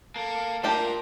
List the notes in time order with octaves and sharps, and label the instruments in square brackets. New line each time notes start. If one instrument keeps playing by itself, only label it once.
[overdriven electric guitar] A#3 [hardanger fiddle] A4
[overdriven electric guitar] A#2 [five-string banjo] A3 D4 G4 [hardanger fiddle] A#4 A#5